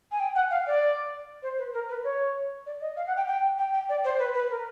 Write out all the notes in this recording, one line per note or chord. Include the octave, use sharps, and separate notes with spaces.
G#5
G5
F#5
F5
D5
C5
B4
A#4
B4
C#5
D5
D#5
F5
F#5
G5
G5
G5
G5
D5
C5
B4
B4
A#4